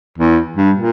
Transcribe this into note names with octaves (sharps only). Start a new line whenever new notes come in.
E2
G2
A#2